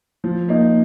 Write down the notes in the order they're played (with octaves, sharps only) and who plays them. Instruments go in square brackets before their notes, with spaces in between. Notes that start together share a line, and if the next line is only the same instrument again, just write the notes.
[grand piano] F3
A#3 D#4